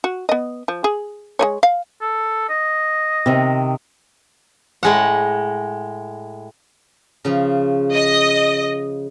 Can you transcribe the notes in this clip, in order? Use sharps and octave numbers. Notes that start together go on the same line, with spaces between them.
F#4
B3 D#5
F3
G#4
G#3 B3 C#5
F5
A4
D#5
C3 D#3
A2 G#3 F#5
C#3 F3
D#5